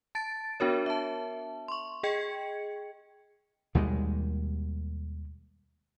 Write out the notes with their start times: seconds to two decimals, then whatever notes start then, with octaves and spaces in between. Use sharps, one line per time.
0.15 A5 A6 D7
0.60 B3 D4 F#4 A#4 C#5
0.86 E5 A5
1.68 C6 C#6
2.03 G#4 D#5 G5 G#6 C#7
3.75 D#2 B2 G3 G#3